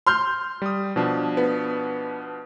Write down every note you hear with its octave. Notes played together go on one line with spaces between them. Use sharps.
C6 F6 G6
G3 D#6
B2 F3 D4
B3